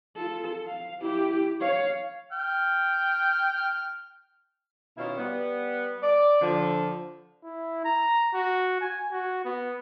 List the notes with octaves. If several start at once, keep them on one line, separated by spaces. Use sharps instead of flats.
F4 A4
F5
E4 G4
C#5 F5
G5 F6
B2 D#3 C#4 E4 F4
G3 B3
D5
D3 F3
E4
A#5
F#4
G#5
F#4
B3